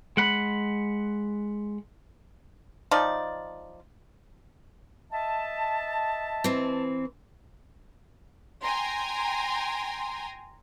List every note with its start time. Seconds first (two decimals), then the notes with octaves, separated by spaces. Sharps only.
0.17 G#3 F#5 B5
2.91 F3 D#4 D5
5.12 D#5 E5 A5
6.44 E3 C4
8.62 G5 G#5 A#5 C6